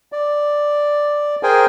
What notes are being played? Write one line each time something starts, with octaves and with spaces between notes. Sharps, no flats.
D5
G#4 A#4 C5 G5 G#5